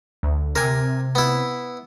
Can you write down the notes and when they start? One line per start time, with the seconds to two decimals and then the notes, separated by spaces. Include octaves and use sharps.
0.23 D2
0.56 C3 A#4 G#5
1.15 B3 E4